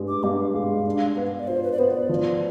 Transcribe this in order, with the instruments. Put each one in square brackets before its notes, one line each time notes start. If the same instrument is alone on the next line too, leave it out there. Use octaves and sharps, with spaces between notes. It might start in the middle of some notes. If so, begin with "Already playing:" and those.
Already playing: [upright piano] G2 G#3
[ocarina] D6
[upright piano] G2 [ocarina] F5
[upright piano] G#3
D4
B3
[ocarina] D5
[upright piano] F4 [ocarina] C5
[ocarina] B4
D5
[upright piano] B3 [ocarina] C5
[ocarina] D5
[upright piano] F3